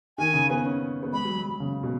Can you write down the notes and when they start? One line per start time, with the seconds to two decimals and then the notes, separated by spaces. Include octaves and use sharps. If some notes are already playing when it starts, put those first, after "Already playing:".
0.18 D#3 G#5
0.34 C#3
0.50 B3
0.65 C#4
1.03 B3
1.13 G#3 B5
1.25 F#3
1.36 F#3
1.48 F#3
1.60 C#3
1.83 B2